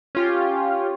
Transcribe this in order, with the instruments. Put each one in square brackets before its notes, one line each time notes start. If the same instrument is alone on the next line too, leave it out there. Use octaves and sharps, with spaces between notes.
[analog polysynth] C#4 F4 G4